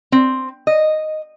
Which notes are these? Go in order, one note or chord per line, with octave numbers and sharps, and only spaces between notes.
C4
D#5